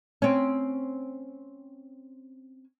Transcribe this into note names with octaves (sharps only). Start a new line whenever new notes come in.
C4 C#4